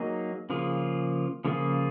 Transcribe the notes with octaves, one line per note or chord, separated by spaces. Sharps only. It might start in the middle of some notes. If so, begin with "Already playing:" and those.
Already playing: F#3 A#3 D#4 G#4
C#3 F3 A#3 F4 G#4
C#3 F3 A#3 F4 G#4